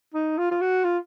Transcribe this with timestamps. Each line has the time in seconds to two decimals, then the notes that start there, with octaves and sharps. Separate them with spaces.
0.14 D#4
0.38 F4
0.51 F4
0.61 F#4
0.84 F4